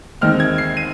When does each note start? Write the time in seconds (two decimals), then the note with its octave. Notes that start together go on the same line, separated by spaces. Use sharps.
0.21 D#2 D#3 G#3 C4 F6
0.40 G#6
0.58 C7
0.77 D#7